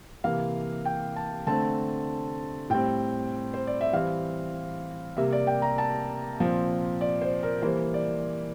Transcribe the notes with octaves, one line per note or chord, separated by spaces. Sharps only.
C3 E3 A#3 F5
G5
A5
D3 A3 C4 A5
A2 G3 C4 G5
C5
D5
E5
E3 G3 C4 F5
C3 G3 A#3 E5
D5
G5
A#5
A5
A#2 F3 C4
D5
C5
A#4
E3 G3 A#3 C5
D5